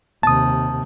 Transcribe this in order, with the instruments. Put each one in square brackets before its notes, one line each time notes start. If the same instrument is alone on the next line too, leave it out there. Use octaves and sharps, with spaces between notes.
[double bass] D#2 C3 [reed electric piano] A5 D#6